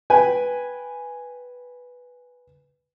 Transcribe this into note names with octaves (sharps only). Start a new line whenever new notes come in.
B4 G5 G#5